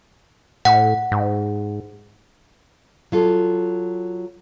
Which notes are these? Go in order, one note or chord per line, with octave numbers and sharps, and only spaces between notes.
A2 F#5
G#2
F#3 F4 A4